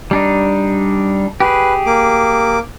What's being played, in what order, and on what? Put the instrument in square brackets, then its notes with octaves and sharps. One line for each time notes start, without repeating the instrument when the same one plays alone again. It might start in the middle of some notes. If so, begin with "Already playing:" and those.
[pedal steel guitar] G3 D4 D#4
[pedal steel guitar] G4 G#4 [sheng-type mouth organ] B4
[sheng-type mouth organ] A#3 D6